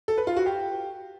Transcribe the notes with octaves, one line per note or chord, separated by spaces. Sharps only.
A4
B4
F4
F#4
G4